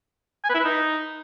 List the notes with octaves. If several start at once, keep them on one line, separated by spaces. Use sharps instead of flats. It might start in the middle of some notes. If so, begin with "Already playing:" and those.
G#5
B4
E4
B4
D#4